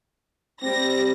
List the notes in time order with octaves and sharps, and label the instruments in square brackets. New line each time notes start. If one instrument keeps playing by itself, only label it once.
[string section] G3 A#6 [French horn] C4